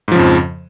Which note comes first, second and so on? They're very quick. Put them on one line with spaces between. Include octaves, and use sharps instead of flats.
G#2 F3 C#3 F2